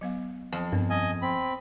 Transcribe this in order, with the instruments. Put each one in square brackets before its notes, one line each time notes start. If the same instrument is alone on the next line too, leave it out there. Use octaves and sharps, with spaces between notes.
[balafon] F#3 B3 F5
[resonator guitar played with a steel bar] F2 [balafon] C4
[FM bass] G2 [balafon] B3 C4 A#4
[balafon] G3 C#4 [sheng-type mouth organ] D#5 G#5
[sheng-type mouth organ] C4 B5